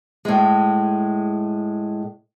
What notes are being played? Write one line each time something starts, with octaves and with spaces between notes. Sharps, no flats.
A2 G#3